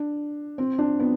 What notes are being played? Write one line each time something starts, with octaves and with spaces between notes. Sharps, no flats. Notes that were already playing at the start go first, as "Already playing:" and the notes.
Already playing: D4
C4
D4
B3